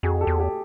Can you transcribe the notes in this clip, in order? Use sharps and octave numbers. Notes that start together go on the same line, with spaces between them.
F2 F#4 G#4
G4 A4
E2
G4 A4